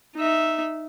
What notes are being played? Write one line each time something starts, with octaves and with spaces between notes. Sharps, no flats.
D#4 E5